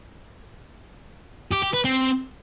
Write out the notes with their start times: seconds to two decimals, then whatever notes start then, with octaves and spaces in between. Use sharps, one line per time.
1.51 G4
1.62 G4
1.73 B4
1.85 C4